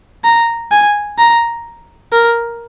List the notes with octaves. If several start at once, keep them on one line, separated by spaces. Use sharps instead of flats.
A#5
G#5
A#5
A#4